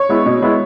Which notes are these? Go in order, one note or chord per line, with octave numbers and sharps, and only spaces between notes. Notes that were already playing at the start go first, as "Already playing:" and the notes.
Already playing: C#5 C#6
G#3 B3 E4
B2
G#3 B3 E4